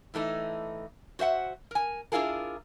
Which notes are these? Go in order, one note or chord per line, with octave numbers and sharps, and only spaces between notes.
A2 E3 A3 D#4
F#4 C5 E5 F#5
A#4 G#5
D4 E4 F4 G#4 A#4